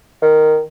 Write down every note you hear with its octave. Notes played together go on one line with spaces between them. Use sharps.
D#3